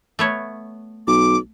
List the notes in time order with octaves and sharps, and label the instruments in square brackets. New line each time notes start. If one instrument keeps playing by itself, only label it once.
[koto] A3 B3 C#5
[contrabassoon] B1 [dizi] D6